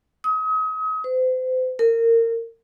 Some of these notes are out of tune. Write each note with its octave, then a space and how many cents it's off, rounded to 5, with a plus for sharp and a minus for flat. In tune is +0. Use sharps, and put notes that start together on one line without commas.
D#6 +35
C5 -35
A#4 -25